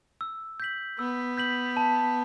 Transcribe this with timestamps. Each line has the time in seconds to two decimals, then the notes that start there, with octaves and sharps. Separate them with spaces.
0.21 E6
0.60 G6 B6 F#7
0.99 B3 E6
1.38 G6 B6 F#7
1.77 A5